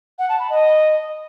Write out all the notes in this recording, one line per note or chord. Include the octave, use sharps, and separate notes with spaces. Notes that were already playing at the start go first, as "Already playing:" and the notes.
F#5
A5
B5
D#5